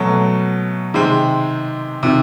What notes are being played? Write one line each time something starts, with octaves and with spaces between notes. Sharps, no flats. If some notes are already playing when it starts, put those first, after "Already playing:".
Already playing: B2 F#3 A3
C3 D#3 G#3 C4
C3 D#3